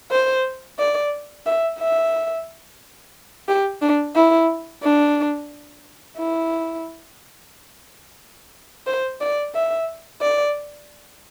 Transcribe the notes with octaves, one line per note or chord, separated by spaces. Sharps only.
C5
D5
E5
E5
G4
D4
E4
D4
E4
C5
D5
E5
D5